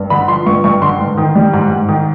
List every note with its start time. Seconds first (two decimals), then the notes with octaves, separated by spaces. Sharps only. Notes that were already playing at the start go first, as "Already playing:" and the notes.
Already playing: G2
0.10 D3 B5
0.28 F3 C6
0.46 G2 C#6
0.64 G2 C#6
0.82 D3 C6
0.99 G#2
1.17 D#3
1.35 G3
1.53 G#2
1.71 G#2
1.89 D#3